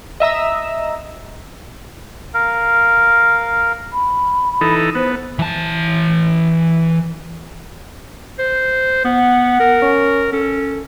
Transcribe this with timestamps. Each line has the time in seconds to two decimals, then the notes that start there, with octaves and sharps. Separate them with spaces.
0.20 D#5 E5 A#5 E6
2.34 A#4 F5
3.93 B5
4.61 E3 D#4 A4
4.95 B3 C5
5.39 E3 A5
8.39 C5
9.05 B3 F#5
9.60 A#4
9.81 C#4
10.33 C#4 A4